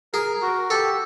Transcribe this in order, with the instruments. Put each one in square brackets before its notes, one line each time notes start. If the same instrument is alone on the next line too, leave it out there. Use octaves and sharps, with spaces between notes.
[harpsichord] G#4 [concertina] A#4
[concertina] F#4
[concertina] G4 [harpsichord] A4